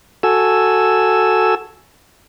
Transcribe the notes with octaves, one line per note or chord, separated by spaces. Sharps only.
F#4 A4 G#5 E6